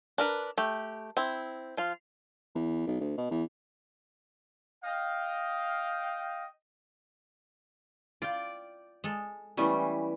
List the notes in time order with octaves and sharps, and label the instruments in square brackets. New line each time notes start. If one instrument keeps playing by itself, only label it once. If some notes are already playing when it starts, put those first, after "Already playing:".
[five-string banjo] D4 A#4 B4
A3 G4
C4 E4
F3 F4
[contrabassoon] E2
B1
D2
B2
E2
[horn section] D#5 F5 G5
[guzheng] F4 [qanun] D5 G5
[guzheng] G#3 A4
[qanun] E3 G3 [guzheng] A3 B3 C#4